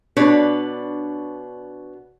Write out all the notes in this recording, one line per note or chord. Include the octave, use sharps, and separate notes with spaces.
B2 D4 B4 C#5